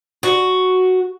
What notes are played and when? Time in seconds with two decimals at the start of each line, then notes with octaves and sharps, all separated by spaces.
0.23 F#4